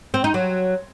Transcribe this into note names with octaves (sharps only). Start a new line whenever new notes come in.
C4
D#4
F#3